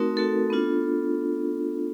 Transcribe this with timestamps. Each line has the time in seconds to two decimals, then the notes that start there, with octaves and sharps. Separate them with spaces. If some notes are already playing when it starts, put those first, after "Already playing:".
Already playing: A3 C4 D#4 F#4 A#4
0.17 A3 C4 D#4 F#4 A4
0.50 B3 D4 F4